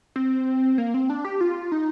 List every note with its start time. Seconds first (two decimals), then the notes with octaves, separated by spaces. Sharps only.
0.16 C4
0.78 A#3
0.94 C4
1.10 D4
1.25 G4
1.41 F4
1.72 D#4